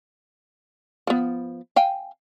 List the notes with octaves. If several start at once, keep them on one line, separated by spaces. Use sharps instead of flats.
F3 B3
F5 G5 G#5